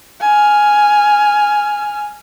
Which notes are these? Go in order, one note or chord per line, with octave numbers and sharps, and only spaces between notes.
G#5 F6